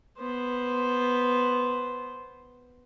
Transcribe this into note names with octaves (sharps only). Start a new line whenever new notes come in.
B3 C5